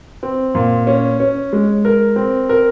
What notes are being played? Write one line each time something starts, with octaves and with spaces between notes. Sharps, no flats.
C4
A#2
C#4
C#4
G#3
A#4
C4
A#4